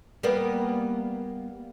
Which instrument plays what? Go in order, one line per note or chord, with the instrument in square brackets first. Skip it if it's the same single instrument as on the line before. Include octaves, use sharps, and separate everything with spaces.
[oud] G3 A#3 B3